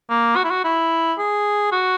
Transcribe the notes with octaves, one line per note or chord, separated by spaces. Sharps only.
A#3
F#4
E4
F#4
E4
G#4
F#4